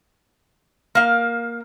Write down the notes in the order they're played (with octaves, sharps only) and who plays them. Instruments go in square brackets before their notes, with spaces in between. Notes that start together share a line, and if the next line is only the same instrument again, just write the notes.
[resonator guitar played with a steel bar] A#3 F5